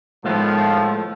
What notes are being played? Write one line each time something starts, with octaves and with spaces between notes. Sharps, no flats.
A2 D#3 F3 G#3 A3 B3